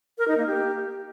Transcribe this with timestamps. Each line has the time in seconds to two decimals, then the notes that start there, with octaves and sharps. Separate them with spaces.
0.18 A#4
0.28 D#4
0.37 A#3
0.47 G4